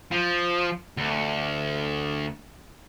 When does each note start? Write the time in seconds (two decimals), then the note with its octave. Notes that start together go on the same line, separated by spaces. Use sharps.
0.12 F3
0.97 D2